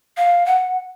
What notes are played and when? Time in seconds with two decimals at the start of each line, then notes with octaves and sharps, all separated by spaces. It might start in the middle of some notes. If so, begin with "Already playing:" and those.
0.17 F5
0.46 F#5